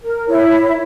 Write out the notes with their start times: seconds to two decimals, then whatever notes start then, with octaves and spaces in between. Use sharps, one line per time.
0.03 A#4
0.29 E4 C#5